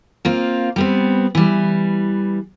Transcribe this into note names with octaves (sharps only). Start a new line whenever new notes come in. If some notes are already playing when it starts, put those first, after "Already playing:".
A#3 C4 F4
G3 B3 C4
E3 G3